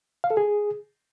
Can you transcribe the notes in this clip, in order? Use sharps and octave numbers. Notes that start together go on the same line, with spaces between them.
F5
A4
G#4